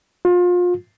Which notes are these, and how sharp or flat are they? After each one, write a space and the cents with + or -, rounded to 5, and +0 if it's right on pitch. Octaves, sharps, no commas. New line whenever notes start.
F4 +30